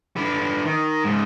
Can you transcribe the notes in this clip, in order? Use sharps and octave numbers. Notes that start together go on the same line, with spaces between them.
D3 B4
D#3
G#2 C#3